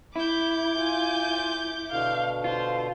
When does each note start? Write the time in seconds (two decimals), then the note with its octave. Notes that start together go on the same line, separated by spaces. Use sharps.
0.16 E4 B5 D6 G6
0.77 F4 G#5
1.91 B2 D3 F5
2.44 F4 C5